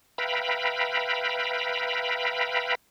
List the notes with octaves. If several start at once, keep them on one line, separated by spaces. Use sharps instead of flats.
B4 E5 F5 G5 A#5 B5